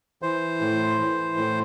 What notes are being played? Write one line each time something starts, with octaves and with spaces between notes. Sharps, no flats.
E3 C5
A2
E3
A2